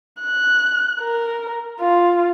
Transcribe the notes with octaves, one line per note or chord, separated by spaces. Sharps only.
F#6
A#4
F4